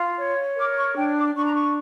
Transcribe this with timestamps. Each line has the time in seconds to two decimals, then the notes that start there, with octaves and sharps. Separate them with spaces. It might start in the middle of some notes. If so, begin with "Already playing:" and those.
Already playing: F4
0.18 C#5
0.57 A#4 D6
0.77 C#6
0.96 D4 G5
1.16 D6
1.35 D4 C#6
1.44 A#5
1.54 C#6